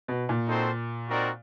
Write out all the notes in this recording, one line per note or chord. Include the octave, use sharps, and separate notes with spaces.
B2
A#2
C4 D#4 F#4 A4 C5
C4 D#4 F#4 A#4 D5